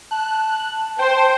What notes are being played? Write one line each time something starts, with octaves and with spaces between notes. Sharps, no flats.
A5 F#6
C5 G5 C6